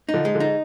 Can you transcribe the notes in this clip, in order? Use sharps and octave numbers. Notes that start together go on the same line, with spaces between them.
D#4
D3 F3
G#3
D3 F3
D#4